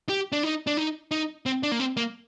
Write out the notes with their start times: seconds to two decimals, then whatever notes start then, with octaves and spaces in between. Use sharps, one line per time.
0.09 G4
0.32 D4
0.43 D#4
0.67 D4
0.77 D#4
1.11 D#4
1.46 C4
1.63 D4
1.72 A#3
1.80 C4
1.97 A#3